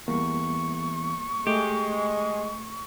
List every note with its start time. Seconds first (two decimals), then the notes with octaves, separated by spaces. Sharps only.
0.08 E2 G3 A#3 C#6
1.47 G#3 A3 G4